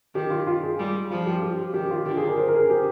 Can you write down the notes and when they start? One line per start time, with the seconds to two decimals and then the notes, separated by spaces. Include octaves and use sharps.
0.15 D#3 G4
0.30 F4
0.47 F4
0.63 G#4
0.79 G3
1.11 F3 F4
1.26 G4
1.42 G4
1.74 D#3 G4
1.91 F4
2.06 D3 G4
2.17 G#4
2.27 A#4
2.37 C5
2.48 A#4
2.54 G#4
2.70 G4